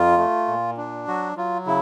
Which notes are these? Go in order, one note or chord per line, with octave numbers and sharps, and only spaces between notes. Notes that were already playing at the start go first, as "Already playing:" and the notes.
Already playing: F2 F4
A3
A#2
D4
F#3 F#4
F#3 F4
C#3 E4